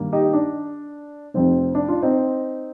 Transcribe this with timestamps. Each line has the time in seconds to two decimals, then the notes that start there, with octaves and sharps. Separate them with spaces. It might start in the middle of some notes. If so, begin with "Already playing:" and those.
Already playing: G2 D#3 A#3
0.13 D#4 G4
0.33 D4
1.34 F1 F2 C3 C4
1.75 D4
1.88 D4 F4
2.03 C4 D#4